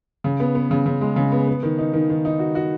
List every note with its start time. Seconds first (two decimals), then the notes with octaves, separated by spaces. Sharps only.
0.24 C#3
0.40 B3
0.55 B3
0.71 C#3
0.86 C#3
1.01 G#3
1.16 C#3
1.32 B3
1.47 B3
1.63 D#3
1.79 D#4
1.93 D#3
2.10 D#3
2.25 D#4
2.39 F#4
2.55 F#4